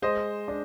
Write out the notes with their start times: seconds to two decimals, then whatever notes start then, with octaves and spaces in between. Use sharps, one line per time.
0.02 G#3 C5 D#5
0.48 D4